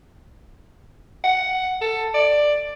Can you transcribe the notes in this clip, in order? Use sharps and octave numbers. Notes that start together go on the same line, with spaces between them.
F#5
A4
D5